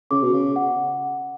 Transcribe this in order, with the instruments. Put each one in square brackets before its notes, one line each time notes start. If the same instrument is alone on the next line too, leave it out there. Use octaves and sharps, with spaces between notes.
[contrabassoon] C#3 [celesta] D6
[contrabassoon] B2
C#3
[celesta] F#5